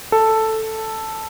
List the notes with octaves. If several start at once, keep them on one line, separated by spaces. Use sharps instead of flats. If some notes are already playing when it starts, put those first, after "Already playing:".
A4